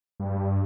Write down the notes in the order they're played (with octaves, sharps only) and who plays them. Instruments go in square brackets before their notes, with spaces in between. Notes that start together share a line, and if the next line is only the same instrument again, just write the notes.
[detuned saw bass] G2